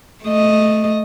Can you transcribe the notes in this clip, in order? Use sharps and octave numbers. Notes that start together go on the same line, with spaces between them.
A3 D#5